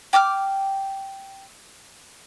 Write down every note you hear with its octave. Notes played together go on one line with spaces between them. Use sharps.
G5 D6 E6 F6